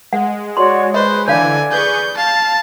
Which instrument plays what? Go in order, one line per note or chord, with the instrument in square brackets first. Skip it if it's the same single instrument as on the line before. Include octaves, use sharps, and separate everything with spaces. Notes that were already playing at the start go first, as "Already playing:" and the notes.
[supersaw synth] G#3 [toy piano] F#5
[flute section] F#4 C#5 D5 [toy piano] C6
[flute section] B4 [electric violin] C5 [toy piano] D#5
[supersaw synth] D3 E3 [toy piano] C#5 F5 [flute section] D5 [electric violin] G#5
[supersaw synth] G#4 B4 C#6 [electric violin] G6
[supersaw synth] F5 [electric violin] A5